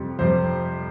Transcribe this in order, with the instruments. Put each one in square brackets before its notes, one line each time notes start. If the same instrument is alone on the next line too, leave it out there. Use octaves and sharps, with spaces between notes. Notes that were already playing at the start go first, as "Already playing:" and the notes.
Already playing: [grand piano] F2 C3 G3
F2 C3 G3 C5